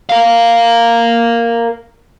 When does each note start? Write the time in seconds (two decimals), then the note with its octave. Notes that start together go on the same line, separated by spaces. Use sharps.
0.09 A#4 F5